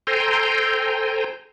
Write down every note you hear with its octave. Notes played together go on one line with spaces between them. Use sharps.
A4 C5 G5 G#5 A#5 C6